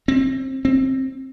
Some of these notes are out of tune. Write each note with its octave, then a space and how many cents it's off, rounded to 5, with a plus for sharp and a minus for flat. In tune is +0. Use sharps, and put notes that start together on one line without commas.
C4 +25
C4 +20